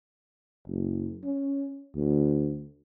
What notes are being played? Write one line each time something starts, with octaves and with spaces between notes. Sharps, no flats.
F#1
C#4
D2